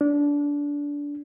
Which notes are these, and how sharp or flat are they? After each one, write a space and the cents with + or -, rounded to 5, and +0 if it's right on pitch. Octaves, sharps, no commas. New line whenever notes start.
D4 -20